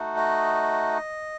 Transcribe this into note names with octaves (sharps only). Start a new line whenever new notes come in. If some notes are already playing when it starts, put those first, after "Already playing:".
Already playing: A3 D#4 F#4
D#5